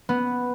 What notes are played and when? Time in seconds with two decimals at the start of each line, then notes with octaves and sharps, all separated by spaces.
0.09 B3